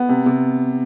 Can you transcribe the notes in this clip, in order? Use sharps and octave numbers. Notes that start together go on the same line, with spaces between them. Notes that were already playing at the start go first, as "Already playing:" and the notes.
Already playing: B3
C3
C3